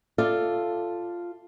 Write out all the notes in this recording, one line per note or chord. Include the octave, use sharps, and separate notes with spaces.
F4 A4 D5 E5 F5